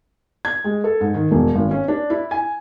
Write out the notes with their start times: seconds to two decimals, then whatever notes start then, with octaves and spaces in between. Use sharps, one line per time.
0.45 G#6
0.64 G#3
0.84 A4
1.01 G#2
1.14 D#3
1.31 E1
1.55 G#1
1.71 C#4
1.88 D4
2.10 E4
2.31 G#5